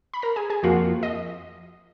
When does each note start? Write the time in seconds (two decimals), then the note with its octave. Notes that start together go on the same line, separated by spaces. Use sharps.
0.14 B5
0.22 A#4 A#5
0.36 G#4 G#5
0.50 G#4 G#5
0.63 F2 F3 A#3 F4 F#4 F#5
1.03 D#5